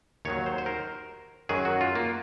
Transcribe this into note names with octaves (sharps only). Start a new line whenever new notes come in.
D#2 D#3 F#3 C#5
C5
C5
A#4
F#2 D#3 F#3 G#4
F#4
F4
A#3